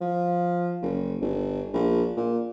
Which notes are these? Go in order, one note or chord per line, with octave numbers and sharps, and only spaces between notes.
F3
F#1
G1
A#1
A#2